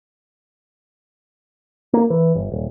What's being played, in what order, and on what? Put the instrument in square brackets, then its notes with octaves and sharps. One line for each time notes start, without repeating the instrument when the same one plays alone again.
[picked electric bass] A#3
E3
G1
D#1